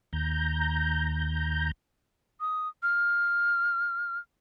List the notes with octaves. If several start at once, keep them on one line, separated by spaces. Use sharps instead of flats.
D#2 A#5 G6
D#6
F6